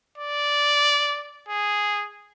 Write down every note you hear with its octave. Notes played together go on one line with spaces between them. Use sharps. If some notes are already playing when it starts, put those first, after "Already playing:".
D5
G#4